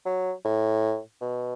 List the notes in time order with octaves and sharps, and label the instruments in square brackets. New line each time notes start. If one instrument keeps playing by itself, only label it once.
[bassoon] F#3
A2
B2